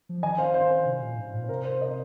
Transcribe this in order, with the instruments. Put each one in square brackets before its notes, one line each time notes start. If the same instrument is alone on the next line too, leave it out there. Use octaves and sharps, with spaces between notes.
[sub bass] F3
[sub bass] D#3 [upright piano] D#5 G#5
[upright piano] C5 F5
C5 F5
C5
[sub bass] C3
A#2
G#2
A#2
[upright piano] C5
[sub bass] C3 [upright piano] A#4
[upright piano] C5
A#4 D#5